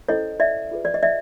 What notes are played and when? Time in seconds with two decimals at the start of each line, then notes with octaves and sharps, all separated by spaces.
0.08 C#4 E4 A4 C5 C#5 D#5
0.40 D5 E5
0.71 F4 G#4 B4
0.85 D5
0.94 D#5
1.03 D5 E5